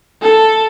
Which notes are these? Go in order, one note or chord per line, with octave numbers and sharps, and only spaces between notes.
A4